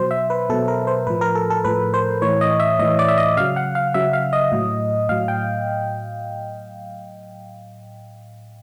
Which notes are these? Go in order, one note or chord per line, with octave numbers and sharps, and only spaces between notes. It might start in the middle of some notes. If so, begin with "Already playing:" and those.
Already playing: B2 F#3 C5
E5
B4
B2 F#3 A4
A#4
C5
A2 F3 B4
A#4
A4
A4
A2 F3 B4
C5
A2 E3 C#5
D#5
E5
A2 E3 D#5
D5
E5
D#5
C#3 F#3 F5
F#5
F5
C#3 F#3 E5
F5
D#5
A2 F#3
A2 F#3 F5
G5